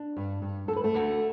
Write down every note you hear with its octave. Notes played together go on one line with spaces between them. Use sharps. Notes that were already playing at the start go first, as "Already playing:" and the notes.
Already playing: D4
G2
G2
D2 A4
B4
A3 A4
D2